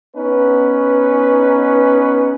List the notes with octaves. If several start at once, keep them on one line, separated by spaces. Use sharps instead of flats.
B3 C#4 D#4 B4